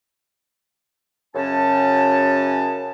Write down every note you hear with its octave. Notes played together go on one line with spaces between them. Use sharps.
F#2 C#3 C#4 A5